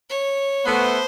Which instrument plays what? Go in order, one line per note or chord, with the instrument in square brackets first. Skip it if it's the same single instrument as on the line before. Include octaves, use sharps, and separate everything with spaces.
[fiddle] C#5
[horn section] A3 B3 [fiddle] C5